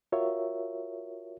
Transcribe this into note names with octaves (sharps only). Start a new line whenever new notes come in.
F4 F#4 A#4 C#5 E5